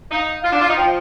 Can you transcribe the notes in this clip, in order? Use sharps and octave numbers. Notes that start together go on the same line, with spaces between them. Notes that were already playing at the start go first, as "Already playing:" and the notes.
D#4 F5
F4
D4
F4
D#4
F3 G5